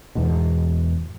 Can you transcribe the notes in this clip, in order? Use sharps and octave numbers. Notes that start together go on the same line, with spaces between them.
E2 G#2 B2